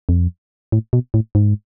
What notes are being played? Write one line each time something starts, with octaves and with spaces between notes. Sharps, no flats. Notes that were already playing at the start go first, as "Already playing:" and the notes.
F2
A2
B2
A2
G#2